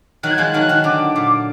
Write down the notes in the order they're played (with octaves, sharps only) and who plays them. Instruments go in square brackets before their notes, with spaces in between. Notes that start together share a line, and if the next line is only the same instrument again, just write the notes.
[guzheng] D#3 F#3 [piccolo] F#6
[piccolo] G#6
[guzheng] F3 G#3 [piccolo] F#6
[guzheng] D#3 F#3
D#3
[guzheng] D3 [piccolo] D6
[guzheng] A#2